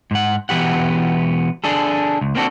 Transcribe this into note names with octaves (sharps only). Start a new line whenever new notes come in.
G#2 F#5
B2 E3 B3 G4 F#5
D4 G#4 A4
C#2
A#3 C4 D4 F#4 A4